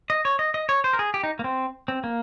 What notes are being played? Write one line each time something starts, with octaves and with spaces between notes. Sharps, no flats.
D#5
C#5
D#5
D#5
C#5
C5
A#4
G#4
G4
D#4
A#3
C4
C4
A#3